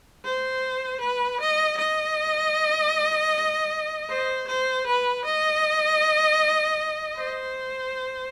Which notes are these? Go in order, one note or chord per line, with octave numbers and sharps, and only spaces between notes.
C5
B4
D#5
D#5
C5
C5
B4
D#5
C5